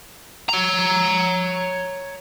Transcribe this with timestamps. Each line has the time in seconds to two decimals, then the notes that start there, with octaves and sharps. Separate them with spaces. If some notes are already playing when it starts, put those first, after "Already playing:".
0.49 C#5 A#5